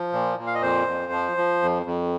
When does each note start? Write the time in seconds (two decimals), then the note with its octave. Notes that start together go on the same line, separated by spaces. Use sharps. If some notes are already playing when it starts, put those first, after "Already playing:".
Already playing: F3
0.13 A#2
0.38 A#2
0.47 F5
0.55 D#5
0.62 F2 C5
0.87 F2
1.12 F3
1.37 F3
1.62 F2
1.86 F2